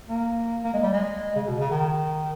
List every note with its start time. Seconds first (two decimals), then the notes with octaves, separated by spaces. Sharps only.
0.09 A#3
0.63 A#3
0.74 G#3
0.83 G3
0.93 G#3
1.35 C#3
1.47 B2
1.59 C#3
1.71 D#3